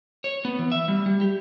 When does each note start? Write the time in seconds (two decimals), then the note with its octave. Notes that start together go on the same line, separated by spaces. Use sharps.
0.24 C#5
0.45 B3
0.59 E3
0.72 E5
0.88 G3
1.06 G3
1.21 G4